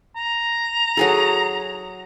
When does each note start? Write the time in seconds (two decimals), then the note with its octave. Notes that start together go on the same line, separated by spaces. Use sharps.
0.16 A#5
0.97 F#3 G#4 A4